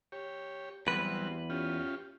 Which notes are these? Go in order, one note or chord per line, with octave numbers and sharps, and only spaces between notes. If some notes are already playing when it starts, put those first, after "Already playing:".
G4 C#5
E2 F#3 G3 C4 B4
C#4 F4 G4